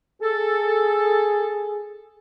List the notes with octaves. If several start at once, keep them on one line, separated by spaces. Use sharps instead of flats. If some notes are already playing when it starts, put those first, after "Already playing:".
G#4 A4